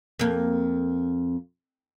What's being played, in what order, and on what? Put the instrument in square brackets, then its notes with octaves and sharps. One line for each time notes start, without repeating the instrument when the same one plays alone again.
[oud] F2 A#3